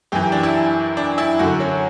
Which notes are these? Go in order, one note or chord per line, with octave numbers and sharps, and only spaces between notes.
F#2 E3 G4
D4
E4
D4
E4
F#2 D3 F#4
C#4